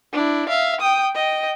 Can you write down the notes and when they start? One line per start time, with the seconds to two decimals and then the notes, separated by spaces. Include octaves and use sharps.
0.13 D4 E4
0.49 E5 F5
0.81 G5 D#6
1.15 D#5 G5